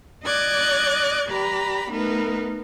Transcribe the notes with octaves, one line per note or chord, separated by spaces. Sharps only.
D5 D#5 D6 F#6 G#6 A6
G4 B4 D5 A#5 B5
A3 B3 D#4 A#4 B4